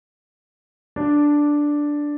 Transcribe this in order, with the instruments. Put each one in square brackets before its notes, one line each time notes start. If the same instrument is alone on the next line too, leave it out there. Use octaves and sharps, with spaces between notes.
[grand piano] D4